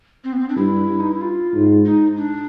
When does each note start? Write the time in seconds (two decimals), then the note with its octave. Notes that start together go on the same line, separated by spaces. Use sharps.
0.24 C4
0.32 B3
0.40 C4
0.49 D4
0.56 G2 E4
1.00 D#4
1.11 E4
1.21 F4
1.53 G#2
1.85 D#4
2.17 D4